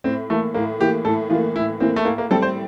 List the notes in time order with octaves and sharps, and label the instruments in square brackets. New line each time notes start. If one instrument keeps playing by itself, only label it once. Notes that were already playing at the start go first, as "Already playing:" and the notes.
[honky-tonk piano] A2 [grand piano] C4
[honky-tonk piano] E3 A#3 [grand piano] A3
[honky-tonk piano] A2 [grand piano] A#3
[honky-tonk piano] E3 A#3 [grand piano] G4
[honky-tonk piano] A2 [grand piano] A4
[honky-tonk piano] E3 A#3 [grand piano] F4
[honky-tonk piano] A2 [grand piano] E4
[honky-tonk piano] E3 A#3 [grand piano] C4
[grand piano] A3
[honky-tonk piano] A2 [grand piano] A#3
[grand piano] A#3
[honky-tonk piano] G3 C4 [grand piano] A4
[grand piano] C5